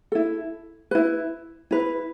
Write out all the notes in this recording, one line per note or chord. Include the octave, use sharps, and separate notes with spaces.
E4 A4
E4 B4
E4 B4